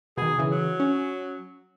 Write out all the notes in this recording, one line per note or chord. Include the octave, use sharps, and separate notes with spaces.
B2 D#3 G#4
C#3 E3
F#3
C#4